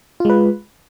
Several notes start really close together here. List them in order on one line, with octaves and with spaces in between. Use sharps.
F4 G#3 B4